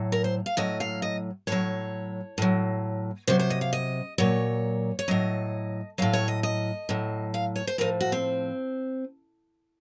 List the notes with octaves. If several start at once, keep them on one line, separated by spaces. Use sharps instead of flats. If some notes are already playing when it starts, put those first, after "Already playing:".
Already playing: A2 F#3
A#4
C5
F5
A2 F#3 D#5
F5
D#5
A2 F#3 C#5
A2 F#3
C3 F#3 C5
C5
D#5
F5
D#5
A#2 F#3 C#5
C#5
A2 F#3 D#5
A2 F#3 F5
C#5
D#5
D#5
A2 F#3
F5
C#5
C5
A2 F3 A#4
F#4
C4